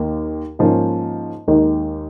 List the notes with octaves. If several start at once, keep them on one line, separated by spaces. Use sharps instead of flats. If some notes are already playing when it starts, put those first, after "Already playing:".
Already playing: D#2 D#3 A#3 D#4
G#2 F3 A#3 C#4
D#2 D#3 G#3